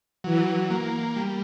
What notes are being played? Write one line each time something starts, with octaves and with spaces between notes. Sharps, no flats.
E3 F#3
A#3
G3